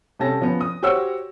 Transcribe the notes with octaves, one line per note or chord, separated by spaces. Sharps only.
C3 G3 C#4 A4 A5 A#6
F3 B3 C#4
D#6
F#4 G4 C5 C#5 F#5 E6